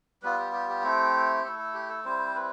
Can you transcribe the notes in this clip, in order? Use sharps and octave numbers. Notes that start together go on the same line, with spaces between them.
G3 B3 F4 B4
G4
G4
G4
A3 C4 E4
A3 E4 A4
A4
G4
A4
G3 C4 E4 C5
B4